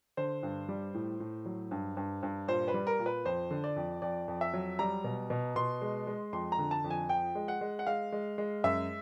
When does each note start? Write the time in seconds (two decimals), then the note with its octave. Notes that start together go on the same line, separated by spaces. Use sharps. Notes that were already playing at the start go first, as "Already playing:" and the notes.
0.17 D3 C5
0.43 G2
0.69 G3
0.94 A2
1.20 A2
1.45 F#3
1.71 G2
1.97 G2
2.23 G2
2.48 A#2 C5
2.68 B4
2.74 G3
2.87 A#4
2.99 A#2
3.06 B4
3.25 F2 C5
3.51 D3
3.64 D5
3.76 F2
4.02 F2 D5
4.28 F2
4.41 E5
4.53 F#3
4.79 G3 A#5
5.04 B2
5.30 B2
5.56 B2 C6
5.82 G#3
6.07 G#3
6.33 F2 C6
6.52 A#5
6.58 D3
6.71 A5
6.84 F2
6.91 G#5
7.09 F3 G5
7.35 G#3
7.48 F#5
7.61 G#3
7.79 F#5
7.87 G#3 F5
8.12 G#3
8.38 G#3
8.64 F#2 E5